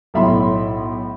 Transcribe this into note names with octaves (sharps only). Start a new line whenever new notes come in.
B1 A2 E5 B5 C6